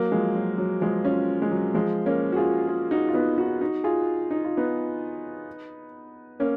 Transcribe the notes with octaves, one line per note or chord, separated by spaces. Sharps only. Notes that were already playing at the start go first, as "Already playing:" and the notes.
Already playing: F#3 A#3
F3 G#3
F#3
F#3
F3 G#3
C#4 F4
G#3
F#3
F3 G#3
A#3 C#4
F#4
F4 G#4
F4 G#4
D#4 F#4
F4
B3 D#4
D#4 F#4
D#4 F#4
F4 G#4
D#4
F4
B3 D#4
A#3 C#4